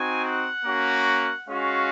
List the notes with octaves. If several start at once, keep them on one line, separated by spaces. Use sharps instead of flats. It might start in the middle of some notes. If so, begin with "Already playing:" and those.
Already playing: C4 D#4 F#4 G#5
F#5
A#3 C#4 F#4
G#3 C#4 F#4 F5